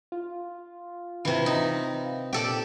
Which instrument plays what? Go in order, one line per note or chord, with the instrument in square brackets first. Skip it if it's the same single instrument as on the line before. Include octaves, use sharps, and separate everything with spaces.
[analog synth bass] F4
[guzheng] C3 E3
D#4
[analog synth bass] A#2 [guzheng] G4 A4 D5